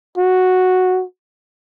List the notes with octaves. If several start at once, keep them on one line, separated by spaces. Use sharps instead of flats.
F#4